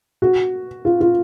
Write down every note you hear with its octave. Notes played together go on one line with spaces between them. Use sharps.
F#4
F4
F4